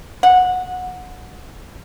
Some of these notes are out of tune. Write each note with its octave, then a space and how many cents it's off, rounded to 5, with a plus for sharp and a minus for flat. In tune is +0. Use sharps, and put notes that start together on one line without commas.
F#5 -20